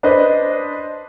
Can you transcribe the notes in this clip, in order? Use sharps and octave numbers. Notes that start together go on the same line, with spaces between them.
D4 B4 C5 D#5